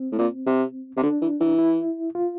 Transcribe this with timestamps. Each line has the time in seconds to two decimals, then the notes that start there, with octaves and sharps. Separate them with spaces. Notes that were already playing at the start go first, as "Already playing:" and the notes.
Already playing: C4
0.12 A2
0.18 A#2
0.46 C3
0.97 C3
1.03 D3 D4
1.21 E3
1.40 E3
1.59 E4
2.15 F4